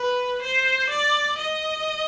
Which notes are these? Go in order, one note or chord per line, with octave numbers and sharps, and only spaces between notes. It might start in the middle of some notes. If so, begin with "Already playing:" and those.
Already playing: B4
C5
D5
D#5